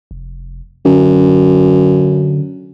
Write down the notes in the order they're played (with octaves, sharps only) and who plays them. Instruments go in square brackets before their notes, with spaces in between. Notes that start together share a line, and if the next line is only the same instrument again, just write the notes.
[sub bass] F1
[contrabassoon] F#2 [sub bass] D3